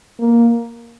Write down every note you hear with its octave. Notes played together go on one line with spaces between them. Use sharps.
A#3